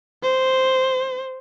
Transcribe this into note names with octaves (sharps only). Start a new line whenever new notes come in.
C5